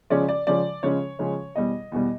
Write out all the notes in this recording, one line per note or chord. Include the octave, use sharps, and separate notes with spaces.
C#3 F3 G#3 C#4 D5
D5
C#3 F3 G#3 C#4 D5
C#3 F3 G#3 C#4 C#5
C#3 F3 G#3 C#4
E2 B2 G3 D#5
E2 B2 G3